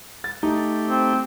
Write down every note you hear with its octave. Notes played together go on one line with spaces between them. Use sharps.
A6
A3 D#4 G4
C4